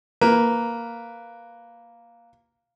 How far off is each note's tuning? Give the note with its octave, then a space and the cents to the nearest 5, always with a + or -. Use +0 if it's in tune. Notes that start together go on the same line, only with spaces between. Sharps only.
A#3 +0 B4 +0